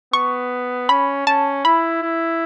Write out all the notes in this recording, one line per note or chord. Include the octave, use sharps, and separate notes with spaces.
B3 C#6
C#4 B5
C#4 A5
E4 B5
E4